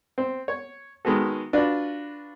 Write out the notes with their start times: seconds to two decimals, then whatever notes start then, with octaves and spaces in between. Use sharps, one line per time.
0.18 C4
0.48 C#5
1.05 D#3 G#3 B3 F#4 A4
1.53 D4 F4 F#4 B4